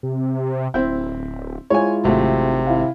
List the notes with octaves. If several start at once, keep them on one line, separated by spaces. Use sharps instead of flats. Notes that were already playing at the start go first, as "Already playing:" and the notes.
C3
D1 C4 E4 G6
G#3 E4 F4 C#5 G#5
G#1 C3 F#3 A3
E4 F5